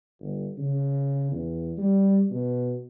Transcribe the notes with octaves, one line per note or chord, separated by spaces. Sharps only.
G1
C#3
E2
G3
B2